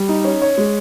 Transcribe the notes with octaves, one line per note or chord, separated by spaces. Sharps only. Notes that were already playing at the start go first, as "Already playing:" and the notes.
Already playing: G3
D#4
C#4
C#5
G#3